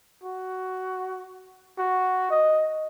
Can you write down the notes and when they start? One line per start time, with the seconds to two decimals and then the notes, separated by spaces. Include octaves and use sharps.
0.24 F#4
1.78 F#4
2.30 D#5